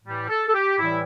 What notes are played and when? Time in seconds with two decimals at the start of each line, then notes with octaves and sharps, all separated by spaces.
0.04 A2 E3 G3
0.29 A4
0.48 A4
0.54 G4
0.79 A2 E3 G3 E4